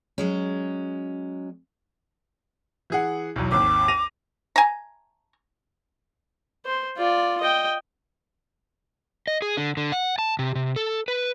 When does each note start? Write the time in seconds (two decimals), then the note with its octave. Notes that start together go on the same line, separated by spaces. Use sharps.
0.18 F#3 G#3 C#4
2.90 E3 G#4 F#5
3.36 B1 E2 F#3
3.52 G#1 D#2 D6
3.88 A#6 D#7 F7
4.56 G#5 A#5
6.65 C5
6.97 F4 D5
7.41 D#5 G5
9.27 D#5
9.42 G#4
9.57 D3
9.77 D3
9.92 F#5
10.18 A5
10.39 C3
10.55 C3
10.76 A4
11.08 B4